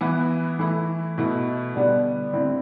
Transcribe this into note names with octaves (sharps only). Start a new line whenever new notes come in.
E3 B3 E4
E3 A3 E4
B2 A3 E4
D3 G3 B3 D4
D3 A3 C4 E4